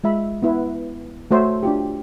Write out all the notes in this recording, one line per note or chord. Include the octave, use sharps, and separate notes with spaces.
G#3 F4 E5 B5
B3 E4 B4
A3 F#4 C5 C#5 E5
D4 F4 G4